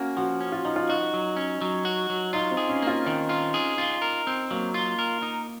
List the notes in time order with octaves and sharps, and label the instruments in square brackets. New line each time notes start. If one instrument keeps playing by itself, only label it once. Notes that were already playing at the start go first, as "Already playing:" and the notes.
Already playing: [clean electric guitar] A#3 [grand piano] C#4 F#4
[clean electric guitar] F3 [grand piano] F#4
[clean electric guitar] C#4
[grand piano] F4
[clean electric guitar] F3 [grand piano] D#4
[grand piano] F4
[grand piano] D#4 [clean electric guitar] F#4
[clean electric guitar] F#3
C#4
F#3
F#4
F#3
[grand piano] D#4 [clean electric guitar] F4
[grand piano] C4
[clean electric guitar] G#4
[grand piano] C#4
[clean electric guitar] A#3 [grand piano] F4
[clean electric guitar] D#3 [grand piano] D#4
[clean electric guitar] F4
G#4
F4
A#4
C4
[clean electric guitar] F#3 [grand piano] A#3
[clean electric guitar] F4
A#4
D#4